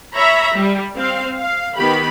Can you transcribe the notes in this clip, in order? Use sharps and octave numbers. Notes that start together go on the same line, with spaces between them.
C#5 E5 A#5 B5
G3
C4 F5
F5
D#3 B3 G4 B5